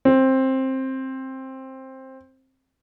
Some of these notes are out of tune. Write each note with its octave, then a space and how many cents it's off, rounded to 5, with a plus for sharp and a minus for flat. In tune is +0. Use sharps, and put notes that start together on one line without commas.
C4 +15